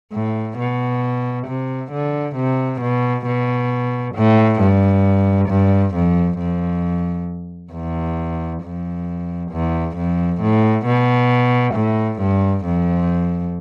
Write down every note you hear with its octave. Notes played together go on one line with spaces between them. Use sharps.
A2
B2
C3
D3
C3
B2
B2
A2
G2
G2
F2
F2
E2
F2
E2
F2
A2
B2
A2
G2
F2